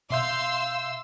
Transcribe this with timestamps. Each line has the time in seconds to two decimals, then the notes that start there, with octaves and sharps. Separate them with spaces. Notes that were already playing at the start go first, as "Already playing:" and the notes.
0.10 B2 E5 F5 C6 E6 G6